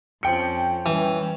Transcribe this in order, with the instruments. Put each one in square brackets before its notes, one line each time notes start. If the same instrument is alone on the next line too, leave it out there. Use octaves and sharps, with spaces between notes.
[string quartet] F2 F3 C#4 [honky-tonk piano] G5 C#7
[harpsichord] E3 [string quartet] G3 C#4